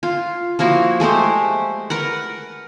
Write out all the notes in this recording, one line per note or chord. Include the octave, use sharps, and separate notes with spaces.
F4
F3 A#3 E4 F#4
G#3 A3 G4 C5
A#4 B4 F#5